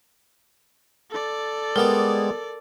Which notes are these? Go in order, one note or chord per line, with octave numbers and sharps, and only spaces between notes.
A4 D5
G3 G#3 B3 A#4 D#5